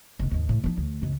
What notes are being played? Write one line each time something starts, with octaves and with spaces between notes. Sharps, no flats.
F1 D#3
D#2 G#2
A2
F3 D#4
D2
C#2 F#2